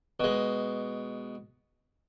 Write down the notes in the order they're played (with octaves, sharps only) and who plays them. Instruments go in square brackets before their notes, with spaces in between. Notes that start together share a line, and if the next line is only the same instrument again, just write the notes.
[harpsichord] B2 G#3